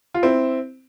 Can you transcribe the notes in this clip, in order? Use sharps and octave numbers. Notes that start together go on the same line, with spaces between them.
F4
C4 E4